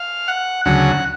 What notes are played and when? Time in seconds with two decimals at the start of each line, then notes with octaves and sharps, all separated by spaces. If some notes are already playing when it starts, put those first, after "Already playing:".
Already playing: F5
0.28 F#5
0.65 D2 C#3 F#3 F#5